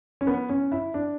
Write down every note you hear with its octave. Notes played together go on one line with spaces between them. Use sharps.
C#4
B3
C#4
E4
D4